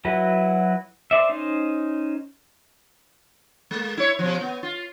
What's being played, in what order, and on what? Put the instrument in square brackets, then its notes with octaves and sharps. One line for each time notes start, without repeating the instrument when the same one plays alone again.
[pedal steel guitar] F#3 E4 F#4 B4
C5 D5 E5
C#4 D#4 C5
[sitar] G#3 A#3
E4 C#5
B2 F3
B3
F4